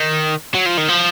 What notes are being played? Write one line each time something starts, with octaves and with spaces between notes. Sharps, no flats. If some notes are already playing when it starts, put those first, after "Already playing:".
Already playing: D#3
F#3
F3
D#3
F3